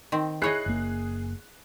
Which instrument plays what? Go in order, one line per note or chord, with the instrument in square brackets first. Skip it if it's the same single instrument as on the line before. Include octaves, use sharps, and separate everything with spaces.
[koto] D#3 C4
[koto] E4 C#5 D#5 [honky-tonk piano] G#4 F#6 C7
[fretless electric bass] F#1 A#3